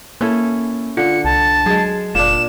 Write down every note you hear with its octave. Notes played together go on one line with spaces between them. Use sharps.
A#3 C#4 E4 A4
D3 F4 C#7
C2 A5
F#3 G#3 G#4
F1 A#2 D4 E7